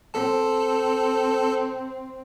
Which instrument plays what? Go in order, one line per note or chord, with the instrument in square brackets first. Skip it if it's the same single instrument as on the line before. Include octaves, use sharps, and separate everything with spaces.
[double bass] C4 [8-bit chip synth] A4 A5